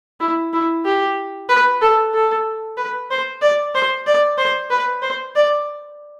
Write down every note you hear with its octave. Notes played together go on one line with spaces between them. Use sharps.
E4
E4
G4
B4
A4
A4
B4
C5
D5
C5
D5
C5
B4
C5
D5